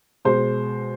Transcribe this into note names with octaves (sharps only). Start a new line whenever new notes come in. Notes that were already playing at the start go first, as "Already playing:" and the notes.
B2 G#3 C5